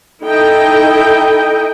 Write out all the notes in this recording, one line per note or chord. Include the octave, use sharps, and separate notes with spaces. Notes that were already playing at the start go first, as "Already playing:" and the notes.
D#4 E4 A4 D#5 G5